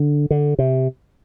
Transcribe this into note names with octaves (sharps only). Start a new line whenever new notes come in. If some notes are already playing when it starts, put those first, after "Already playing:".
Already playing: D3
D3
C3